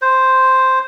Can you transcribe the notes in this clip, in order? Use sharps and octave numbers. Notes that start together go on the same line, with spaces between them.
C5